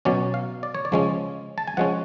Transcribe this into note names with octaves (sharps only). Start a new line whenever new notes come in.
B2 F#3 C#4 D5
F5
D5
C#5
D5
C#3 F3 G#3 C#4
A5
G#5
F3 G#3 C#4 F#5